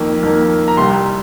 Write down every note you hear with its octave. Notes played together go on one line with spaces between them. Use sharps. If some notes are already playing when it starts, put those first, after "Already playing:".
Already playing: F2 D#3 A#3
F2 D#3 A#3
A#5
C2 C3 G3 C6